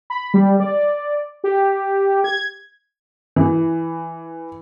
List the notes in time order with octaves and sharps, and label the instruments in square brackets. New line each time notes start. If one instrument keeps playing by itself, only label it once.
[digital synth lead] B5
G3
D5
G4
G#6
[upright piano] E3